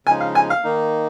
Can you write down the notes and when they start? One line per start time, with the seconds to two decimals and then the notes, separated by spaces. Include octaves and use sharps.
0.07 C#3 F3 G#3 D#4 G#5
0.21 F5
0.35 G#5
0.50 F5
0.64 D#3 A#3 D#4